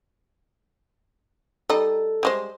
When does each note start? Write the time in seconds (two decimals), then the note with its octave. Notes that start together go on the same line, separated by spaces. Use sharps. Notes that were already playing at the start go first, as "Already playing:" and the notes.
1.70 G3 D#4 A4
2.23 G3 G#3 C5